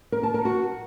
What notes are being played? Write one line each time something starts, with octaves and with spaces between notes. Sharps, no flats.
A#4
A5
A#4
F#4